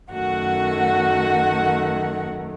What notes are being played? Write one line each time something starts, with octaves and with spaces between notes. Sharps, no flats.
F#2 D#3 F#3 A3 F#4 F#5